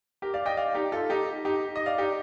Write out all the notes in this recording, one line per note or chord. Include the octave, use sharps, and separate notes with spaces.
G4 A#4
D5 F5
D#5 G5
D5 F5
D#4 G4
F4 A4
D#4 G4
D#4 G4
D#5
D5 F5
D#4 G4